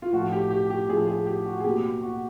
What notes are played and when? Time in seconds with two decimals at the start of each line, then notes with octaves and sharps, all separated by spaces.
0.02 F4
0.13 A2 F3 A3 F#4
0.32 G4
0.51 G4
0.70 G4
0.89 A2 F3 A3 G#4
1.07 G#4
1.26 G4
1.46 F#4
1.60 G#4
1.64 B2 F#3 A#3 G4
2.02 F#4